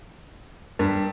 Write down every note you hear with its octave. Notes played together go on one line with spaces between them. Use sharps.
G2 A#4